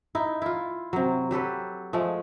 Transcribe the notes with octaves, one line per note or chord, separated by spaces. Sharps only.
D#4 E4
E4 F4
C3 F#3
F#3 G4 A4 B4
F3 G#3 A3